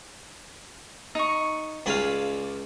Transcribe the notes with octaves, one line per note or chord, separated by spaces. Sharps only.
D#4 C#6
C#2 G#4 D5 F5 B5